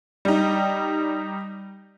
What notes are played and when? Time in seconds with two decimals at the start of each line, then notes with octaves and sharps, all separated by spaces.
0.25 G3 D#4